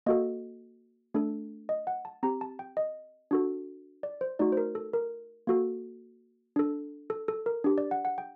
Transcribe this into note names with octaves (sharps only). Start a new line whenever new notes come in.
A#3 F#4 A4 D#5
A3 D4 A4
D#5
F#5
A5
C4 G4 A#5
A5
G5
D#5
D4 F#4 A4
D5
C5
A3 D#4 F#4 D5
C5
A#4
A4
A#4
A#3 F#4 A4
D4 A4
A4
A4
A#4
D4 G4
D5
F#5
F#5
G5